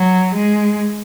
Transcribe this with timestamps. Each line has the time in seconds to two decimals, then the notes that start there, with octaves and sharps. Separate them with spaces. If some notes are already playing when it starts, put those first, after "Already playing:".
Already playing: F#3
0.35 G#3